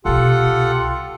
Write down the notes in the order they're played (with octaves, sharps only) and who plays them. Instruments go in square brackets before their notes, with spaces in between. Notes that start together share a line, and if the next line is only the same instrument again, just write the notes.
[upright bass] C2 B2 [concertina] F4 A4 F#5 [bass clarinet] G4